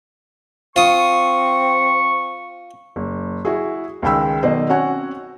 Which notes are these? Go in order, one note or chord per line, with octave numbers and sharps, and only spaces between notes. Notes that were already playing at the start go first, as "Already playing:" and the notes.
C4 F4 C#6 D#6
F#1
E4 F#4 G#4
C#2 D#3 G#3 G5 B5 E6
B1 B2 D#3 C5 D5 D#5
C4 C#4 F#4 C#5 F#5 G#5